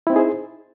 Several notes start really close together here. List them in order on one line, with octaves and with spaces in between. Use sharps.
E4 C4 D#4 G#4 C5